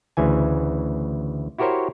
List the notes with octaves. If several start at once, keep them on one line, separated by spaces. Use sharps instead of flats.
D2 C#3 E3 G#5
E4 F#4 G4 A#4 C5 C#5